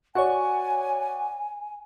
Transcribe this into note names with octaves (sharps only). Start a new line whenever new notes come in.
F#4 C#5 D5 F#5 G#5 C#6